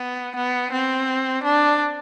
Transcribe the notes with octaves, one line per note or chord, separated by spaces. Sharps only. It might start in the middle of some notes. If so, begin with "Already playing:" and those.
Already playing: B3
B3
C4
D4